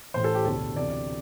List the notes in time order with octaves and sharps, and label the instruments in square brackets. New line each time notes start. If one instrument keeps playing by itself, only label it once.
[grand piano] A1 A2 E3 C5
A4
G4
E1 D2 D3 A4
D2 C3 E3 D5
D5